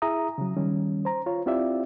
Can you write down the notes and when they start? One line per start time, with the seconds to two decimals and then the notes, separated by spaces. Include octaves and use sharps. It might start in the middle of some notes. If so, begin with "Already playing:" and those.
0.02 E4 G#4 E5 A#5 D#6
0.38 C#3 F#3
0.57 D#3 G3 C#4
1.05 C5 A#5
1.26 F4 C#5
1.46 C4 E4 F4 G4 D5 E5